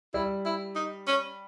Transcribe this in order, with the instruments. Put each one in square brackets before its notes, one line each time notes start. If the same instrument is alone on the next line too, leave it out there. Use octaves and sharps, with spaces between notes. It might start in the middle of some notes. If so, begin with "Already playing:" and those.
[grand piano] G3 [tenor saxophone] E4
[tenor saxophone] E4
D#4
C#4